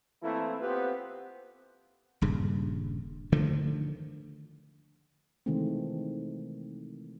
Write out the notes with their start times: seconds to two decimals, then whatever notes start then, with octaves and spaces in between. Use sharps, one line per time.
0.23 E3 A3 A#3 C4 E4
0.61 B3 C4 F4 G4 B4 C5
2.21 D#1 G2 C#3
3.32 D3 D#3 F3 A3
5.46 C3 D#3 E3 G#3 A3 C4